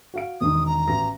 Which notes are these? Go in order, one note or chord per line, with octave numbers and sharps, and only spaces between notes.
F#4 F5 D7
E1 D#3 D#6
A#5
A1 F#4 A#6